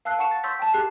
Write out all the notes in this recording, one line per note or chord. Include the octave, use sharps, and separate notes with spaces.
F5 A5 E6 F#6 C7
F#5 A5 C#6 C#7 E7
A6
C6 C#6 E6 G6 A6 B6
G5 A5
G4 G#4 F#6 A6 C7 E7